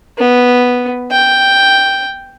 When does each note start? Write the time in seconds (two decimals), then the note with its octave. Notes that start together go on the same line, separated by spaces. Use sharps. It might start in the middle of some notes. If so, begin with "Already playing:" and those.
0.18 B3
1.12 G5